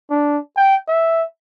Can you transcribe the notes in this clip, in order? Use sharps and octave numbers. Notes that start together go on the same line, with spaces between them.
D4
G5
E5